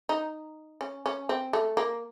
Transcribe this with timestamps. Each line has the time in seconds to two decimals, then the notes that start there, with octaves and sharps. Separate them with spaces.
0.09 D#4
0.81 C#4
1.06 C#4
1.29 C4
1.53 A3
1.77 A#3